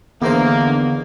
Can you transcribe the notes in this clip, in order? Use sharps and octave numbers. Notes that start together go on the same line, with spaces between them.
E2 D3 D#3 A#3 B3 C5